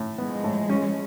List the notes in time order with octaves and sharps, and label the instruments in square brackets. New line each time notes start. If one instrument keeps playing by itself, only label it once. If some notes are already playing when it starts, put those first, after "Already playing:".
Already playing: [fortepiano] A2
[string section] F3 G#3 [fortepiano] B3
[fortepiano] A2
C#4